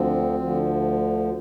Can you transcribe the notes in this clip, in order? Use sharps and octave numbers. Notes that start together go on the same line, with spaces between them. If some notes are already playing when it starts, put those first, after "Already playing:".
Already playing: D2 D3 F3 C4
D2 D3 F3